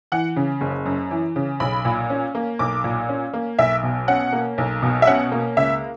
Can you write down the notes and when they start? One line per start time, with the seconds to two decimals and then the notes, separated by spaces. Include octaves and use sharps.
0.12 E3 F#5
0.36 C#3
0.61 F#1
0.86 F#2
1.11 E3
1.36 C#3
1.60 B1 B5
1.85 A#2
2.10 C#4
2.35 A#3
2.59 B1 D6
2.84 A#2
3.09 C#4
3.33 A#3
3.59 B1 E5
3.83 B2
4.08 C#4 F#5
4.33 A#3
4.58 B1
4.83 B2
5.02 E5
5.07 C#4 F#5
5.32 A#3
5.57 C#2 E5